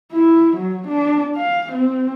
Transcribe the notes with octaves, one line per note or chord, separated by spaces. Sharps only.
E4
F#3
D4
F5
C4